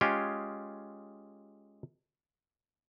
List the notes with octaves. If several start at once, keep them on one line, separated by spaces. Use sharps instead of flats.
G#3 C#4 F4 G4 G#4